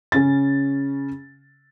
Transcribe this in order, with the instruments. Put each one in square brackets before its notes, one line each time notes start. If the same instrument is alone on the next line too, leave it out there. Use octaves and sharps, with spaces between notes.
[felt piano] C#3 C#4 A6